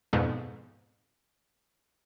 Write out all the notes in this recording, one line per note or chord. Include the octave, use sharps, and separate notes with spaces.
F2 G#2 B2